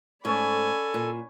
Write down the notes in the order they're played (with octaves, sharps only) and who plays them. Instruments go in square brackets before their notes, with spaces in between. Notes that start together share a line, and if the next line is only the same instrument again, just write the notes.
[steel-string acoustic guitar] G#2 A3 [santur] C#4 C#5 [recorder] A4 [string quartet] D5 G#5 B5
[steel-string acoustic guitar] A#2